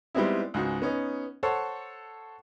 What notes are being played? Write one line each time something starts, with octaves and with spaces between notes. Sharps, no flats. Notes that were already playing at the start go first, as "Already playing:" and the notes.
G3 G#3 B3 C4 D#4 E4
C#2 G#2 F#4
B3 C#4 D#4
A4 C5 C#5 F#5 A5